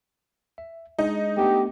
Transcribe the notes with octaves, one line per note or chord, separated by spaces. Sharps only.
E5
G#3 D4 D#4 G#4
A3 B3 D4 G4